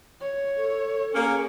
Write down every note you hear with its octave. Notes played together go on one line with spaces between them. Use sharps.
C#5
A4
A#3 C#4 G#4